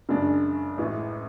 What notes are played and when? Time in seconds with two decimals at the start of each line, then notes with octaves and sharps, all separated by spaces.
0.09 F#2 C#3 G#3 D4
0.77 A1 A2 G#3